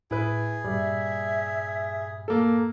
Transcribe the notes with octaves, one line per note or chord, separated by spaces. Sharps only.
A2 E4 G#4 B4
G2 A#2 G3 E5
A#3 A4